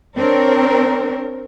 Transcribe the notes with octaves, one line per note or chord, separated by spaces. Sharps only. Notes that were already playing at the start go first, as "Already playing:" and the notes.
C4 D4 A#4 C#5